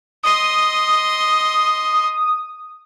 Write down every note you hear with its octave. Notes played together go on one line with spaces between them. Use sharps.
D#5 C6 D#6